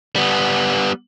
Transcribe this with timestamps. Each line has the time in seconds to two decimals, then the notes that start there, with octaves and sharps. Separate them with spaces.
0.16 G3 B3